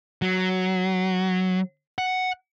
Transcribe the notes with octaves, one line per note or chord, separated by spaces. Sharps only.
F#3
F#5